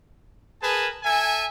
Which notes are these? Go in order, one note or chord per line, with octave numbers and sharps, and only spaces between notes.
G#4 A#4 B4 G#5 A5
A4 E5 G#5